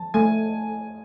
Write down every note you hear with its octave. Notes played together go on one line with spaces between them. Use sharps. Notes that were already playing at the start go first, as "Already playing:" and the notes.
Already playing: F3 A5
A3 G#5